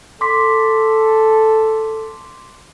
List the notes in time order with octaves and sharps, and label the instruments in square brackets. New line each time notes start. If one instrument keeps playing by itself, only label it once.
[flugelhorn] A4 [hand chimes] C6 D6 B6